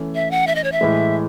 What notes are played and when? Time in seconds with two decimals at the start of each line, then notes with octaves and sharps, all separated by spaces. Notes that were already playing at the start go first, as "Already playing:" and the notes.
Already playing: E3 A3 C#4
0.15 E5
0.31 F#5
0.47 E5
0.55 D#5
0.64 C#5
0.72 E5
0.81 A2 E3 G#3